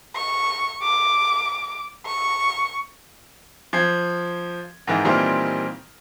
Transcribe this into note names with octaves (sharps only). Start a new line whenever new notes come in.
C#6
D6
C#6
F3 G#6 C7
G#2 D#3 E3
A#2 D#3 E3 G3 C4 F4